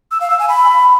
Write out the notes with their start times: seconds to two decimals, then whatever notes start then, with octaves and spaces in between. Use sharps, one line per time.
0.11 E6
0.21 F5
0.30 E6
0.39 G#5
0.49 B5